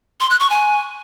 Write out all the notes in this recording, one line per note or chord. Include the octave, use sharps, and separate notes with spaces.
C6
F#6
C#6
G#5